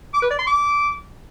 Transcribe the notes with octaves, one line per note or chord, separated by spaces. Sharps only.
D6
B4
D5
C6
D6